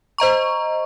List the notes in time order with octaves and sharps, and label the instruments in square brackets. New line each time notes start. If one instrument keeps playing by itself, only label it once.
[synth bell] C5 D#5 A#5 C#6